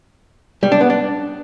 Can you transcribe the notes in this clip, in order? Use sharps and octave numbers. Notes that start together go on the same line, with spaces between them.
G3
D4
B3
D4